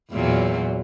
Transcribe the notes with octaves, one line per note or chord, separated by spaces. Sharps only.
E2 A#2 F#3